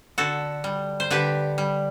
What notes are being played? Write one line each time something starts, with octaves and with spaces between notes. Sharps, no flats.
D3 F#4 A4
G3
C5
D3 G4 B4
G3